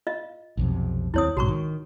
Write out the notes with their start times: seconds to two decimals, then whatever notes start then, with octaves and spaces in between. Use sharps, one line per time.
0.07 F4 D#5 F5
0.57 B1 F2 C3
1.14 D#2 G#3 C4 E4 C#5 D#6
1.37 B1 G#2 F#4 A#5 C#6
1.48 D#3